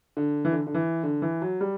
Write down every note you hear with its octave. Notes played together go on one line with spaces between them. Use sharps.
D3
E3
D3
D3
E3
D3
E3
F#3
G3